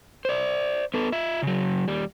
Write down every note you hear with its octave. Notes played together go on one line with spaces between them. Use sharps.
C5 D5
B3 A4
F4 E5
C#3 F#3
D#2 G3